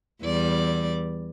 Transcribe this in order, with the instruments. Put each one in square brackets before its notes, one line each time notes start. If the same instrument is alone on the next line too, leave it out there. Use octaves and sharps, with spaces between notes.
[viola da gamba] E2 G3 D5